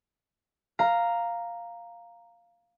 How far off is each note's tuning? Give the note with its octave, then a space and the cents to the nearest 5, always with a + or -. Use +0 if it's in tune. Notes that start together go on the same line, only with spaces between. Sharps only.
F5 +0 A#5 +0